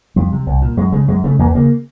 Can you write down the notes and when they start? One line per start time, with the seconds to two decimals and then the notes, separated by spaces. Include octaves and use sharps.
0.16 F2 G3
0.32 C3
0.46 C2
0.62 A#2
0.77 F#2 G#3
0.92 C#3 G#3
1.08 F#2 G#3
1.24 C#3 A3
1.39 E2 A#3
1.55 C#3 A#3